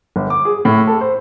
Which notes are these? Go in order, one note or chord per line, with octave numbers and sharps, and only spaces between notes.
G1
D6
G#4
A2
A4
C5